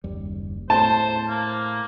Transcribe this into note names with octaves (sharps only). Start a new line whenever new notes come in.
F#1 D#2 G3
A2 C5 A5
A#3